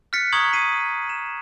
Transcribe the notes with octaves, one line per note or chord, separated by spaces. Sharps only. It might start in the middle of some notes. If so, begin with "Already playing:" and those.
F6 F#6 A6 B6 C#7
A#5 C#6 D#6 G#6 F#7
B6 C7 D#7
E7